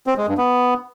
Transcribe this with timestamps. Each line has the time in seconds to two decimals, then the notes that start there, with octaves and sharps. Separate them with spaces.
0.07 C4
0.17 G#3
0.27 G2
0.38 B3